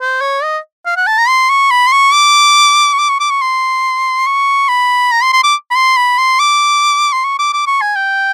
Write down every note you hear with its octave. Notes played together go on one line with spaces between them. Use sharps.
C5
C#5
D#5
F5
F#5
A5
A#5
C6
C#6
B5
C6
C#6
D6
C#6
D6
C#6
D6
C#6
C6
C#6
B5
A#5
C6
C6
D6
B5
C6
B5
C6
D6
C6
C#6
D6
D6
C#6
G#5
G5